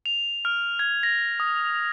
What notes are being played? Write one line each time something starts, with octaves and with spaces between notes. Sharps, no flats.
F7
F6
G#6
A#6
D#6